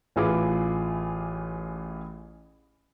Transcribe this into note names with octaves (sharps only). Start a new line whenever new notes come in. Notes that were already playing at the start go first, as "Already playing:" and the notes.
A1 E3 F4 G#4 D6